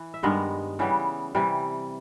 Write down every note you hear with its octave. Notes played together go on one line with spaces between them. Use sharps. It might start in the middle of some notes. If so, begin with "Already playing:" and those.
Already playing: E3
E5
G2 D#3 G#3 B3 D#5
C#3 E3 G3 B3
C3 E3 G3